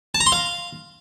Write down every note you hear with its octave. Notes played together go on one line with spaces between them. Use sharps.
A5
A#5
C6
F5